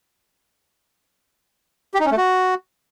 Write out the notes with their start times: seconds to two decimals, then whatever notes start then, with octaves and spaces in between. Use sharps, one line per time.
1.94 G4
2.00 D#4
2.06 C#4
2.12 A3
2.17 F#4